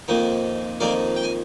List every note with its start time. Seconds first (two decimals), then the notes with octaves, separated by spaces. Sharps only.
0.08 F2 D#3 A#3 D#4
0.80 F2 D#3 A#3 D#4 D5 F5
1.16 G5
1.23 G#5